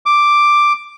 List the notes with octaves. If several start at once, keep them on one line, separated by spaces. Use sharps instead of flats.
D6